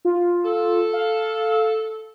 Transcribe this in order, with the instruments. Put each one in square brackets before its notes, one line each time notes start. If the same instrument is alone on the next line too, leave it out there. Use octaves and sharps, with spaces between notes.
[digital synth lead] F4
[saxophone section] A4
[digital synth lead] F5